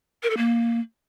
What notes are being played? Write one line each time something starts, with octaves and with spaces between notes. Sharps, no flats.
A#4
A4
A#3